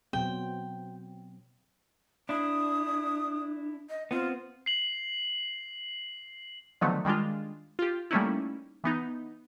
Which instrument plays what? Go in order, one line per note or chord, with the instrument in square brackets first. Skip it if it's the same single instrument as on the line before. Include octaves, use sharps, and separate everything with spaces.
[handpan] B2 F#3 C4 [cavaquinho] G5
[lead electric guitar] D4 E4 [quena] D#6
[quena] D#5
[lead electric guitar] B3 C4 [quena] F4
[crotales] C7 F#7
[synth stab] D3 D#3 F3 F#3 A3 B3
D#3 G3 G#3 D4 F4
F4 G4
G3 A3 A#3 C#4 D#4 E4
E3 B3 D#4